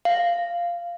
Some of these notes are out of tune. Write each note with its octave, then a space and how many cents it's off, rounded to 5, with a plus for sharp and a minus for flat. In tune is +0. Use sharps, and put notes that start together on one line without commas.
F5 -10